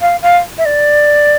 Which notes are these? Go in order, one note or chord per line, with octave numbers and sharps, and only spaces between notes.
F5
F5
E5
D5